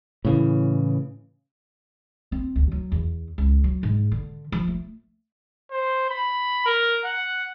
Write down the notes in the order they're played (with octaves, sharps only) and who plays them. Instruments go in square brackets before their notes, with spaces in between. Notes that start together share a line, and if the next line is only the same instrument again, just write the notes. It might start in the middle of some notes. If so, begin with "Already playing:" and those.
[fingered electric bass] A2 C#3 E3
[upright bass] C4
D2
F#3
E2
C#2
F#3
G#2
D3
F3
A3
[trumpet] C5
B5
A#4
F#5